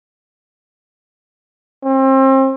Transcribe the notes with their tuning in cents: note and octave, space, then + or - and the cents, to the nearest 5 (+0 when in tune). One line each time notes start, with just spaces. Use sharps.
C4 +35